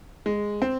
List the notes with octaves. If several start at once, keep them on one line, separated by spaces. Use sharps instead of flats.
G#3
C4